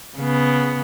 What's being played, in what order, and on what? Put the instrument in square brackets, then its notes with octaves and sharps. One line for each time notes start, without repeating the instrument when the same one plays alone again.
[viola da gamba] C#3 B3